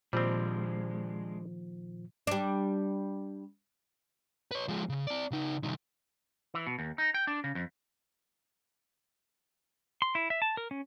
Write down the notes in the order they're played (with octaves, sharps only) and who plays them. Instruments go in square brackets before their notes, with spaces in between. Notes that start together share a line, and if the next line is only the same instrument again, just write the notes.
[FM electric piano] A#2 [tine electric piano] D#3 F3 [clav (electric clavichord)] G3 C4 [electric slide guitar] G#3 D4
[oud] G3 D4
[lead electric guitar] B4 C#5
F3 G#3
C#3
C4 D5
C#3 D#4
C2 D#3
[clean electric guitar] E3
B2
D#2
D#4
G5
D4
C#3
F2
[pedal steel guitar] C6
E4
E5
A5
A#4
C#4